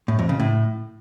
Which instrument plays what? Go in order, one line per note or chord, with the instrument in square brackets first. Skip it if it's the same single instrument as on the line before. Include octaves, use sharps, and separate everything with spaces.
[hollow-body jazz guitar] A2
F2
C#3
A2